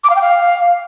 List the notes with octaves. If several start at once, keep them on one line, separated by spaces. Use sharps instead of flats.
D6
F5
G5
F5